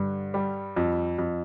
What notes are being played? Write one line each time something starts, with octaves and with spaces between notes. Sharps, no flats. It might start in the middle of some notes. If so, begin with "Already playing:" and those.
Already playing: G2 D3
G3
F2
F2